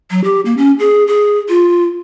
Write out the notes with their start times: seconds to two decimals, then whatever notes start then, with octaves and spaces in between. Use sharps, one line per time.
0.11 F#3
0.24 G4
0.45 A#3
0.57 C#4
0.79 G#4
1.07 G#4
1.49 F4